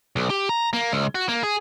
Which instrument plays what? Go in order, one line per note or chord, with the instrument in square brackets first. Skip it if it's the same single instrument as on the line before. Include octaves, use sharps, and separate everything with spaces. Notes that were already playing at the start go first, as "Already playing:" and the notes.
[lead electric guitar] B1
G4
A#5
A#3
C#2
F#4
A#3
G#4